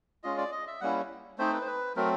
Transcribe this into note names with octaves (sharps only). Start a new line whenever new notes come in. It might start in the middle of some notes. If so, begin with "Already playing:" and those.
G#3 C#4 F4 D#5
D5
D#5
E5
G3 A#3 C#4 E4 F#5
A3 C4 D#4 C5
B4
C5
B4
F#3 A3 C4 A#4